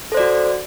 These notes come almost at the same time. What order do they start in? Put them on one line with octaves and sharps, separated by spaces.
A4 C5 D5 F#4